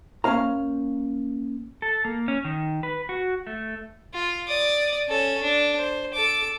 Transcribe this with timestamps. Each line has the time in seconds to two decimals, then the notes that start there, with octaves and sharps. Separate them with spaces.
0.24 A#3 C#4 C5 F5 A#5
1.82 A4
2.05 A#3
2.28 C#4
2.45 D#3
2.83 B4
3.09 F#4
3.47 A3
4.14 F4
4.48 D5 D#6
5.08 C#4 A4
5.42 D4
5.77 C5
6.13 A4 D6